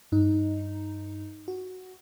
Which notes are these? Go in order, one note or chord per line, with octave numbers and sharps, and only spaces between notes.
G2 D#4
F#4